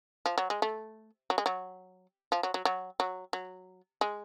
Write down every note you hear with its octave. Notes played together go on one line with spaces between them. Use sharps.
F3
F#3
G#3
A3
F#3
G#3
F#3
F3
F#3
F#3
F#3
F#3
F#3
G#3